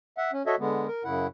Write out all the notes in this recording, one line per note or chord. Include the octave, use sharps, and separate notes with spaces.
E5 F#5
C#4
F#4 A4 C#5 D#5 E5
D3 G#3 B3
A#4
F#2 C#3 E4 F#5